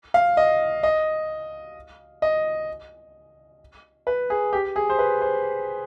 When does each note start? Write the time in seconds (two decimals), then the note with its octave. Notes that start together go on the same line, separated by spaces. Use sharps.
0.14 F5
0.37 D#5
0.83 D#5
2.22 D#5
4.07 B4
4.30 G#4
4.53 G4
4.76 G#4
4.89 C5
4.99 B4
5.21 C5